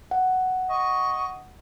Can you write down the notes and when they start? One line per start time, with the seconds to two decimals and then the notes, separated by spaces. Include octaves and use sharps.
0.11 F#5
0.70 D#5 C#6